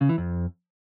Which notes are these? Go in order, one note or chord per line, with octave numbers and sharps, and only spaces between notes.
C#3
E3
F2